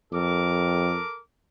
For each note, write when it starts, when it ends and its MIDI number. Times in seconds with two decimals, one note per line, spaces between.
0.13 0.99 41
0.13 1.19 69
0.13 1.19 70
0.13 1.19 86